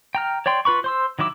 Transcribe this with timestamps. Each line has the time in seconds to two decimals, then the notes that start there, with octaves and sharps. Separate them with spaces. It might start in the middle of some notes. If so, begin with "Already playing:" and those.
0.15 G5 A#5 F6
0.46 C#5 D5 G5 C6
0.65 F4 B4 B5 C#6
0.84 C5 C6 E6
1.19 D#3 F#3 E4 D6 E6